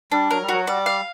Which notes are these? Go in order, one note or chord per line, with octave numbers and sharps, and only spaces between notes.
G3 D4
F#3 A#4
G3
F#3 F#4
G3 D5
F5